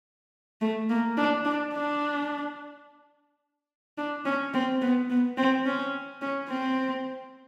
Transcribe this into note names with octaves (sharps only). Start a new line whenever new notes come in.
A3
A#3
D4
D4
D4
D4
C#4
C4
B3
B3
C4
C#4
C#4
C4